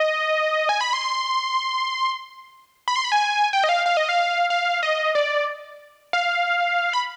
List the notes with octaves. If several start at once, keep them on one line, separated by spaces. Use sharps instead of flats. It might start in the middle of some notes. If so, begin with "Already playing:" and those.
Already playing: D#5
G#5
B5
C6
B5
C6
B5
G#5
G5
D#5
F5
F5
D#5
F5
F5
D#5
D5
F5
B5